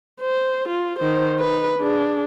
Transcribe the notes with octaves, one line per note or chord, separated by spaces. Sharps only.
C5
F4
D#3 C5
D#4 B4
D4 G#4